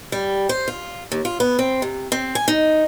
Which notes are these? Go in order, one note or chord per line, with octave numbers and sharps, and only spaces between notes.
G3
C5
F4
D#2
F4
B3
C4
C3
C4
G#5
D#4